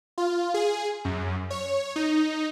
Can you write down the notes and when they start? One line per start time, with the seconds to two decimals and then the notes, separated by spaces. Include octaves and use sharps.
0.18 F4
0.54 G#4
1.05 F#2
1.50 C#5
1.96 D#4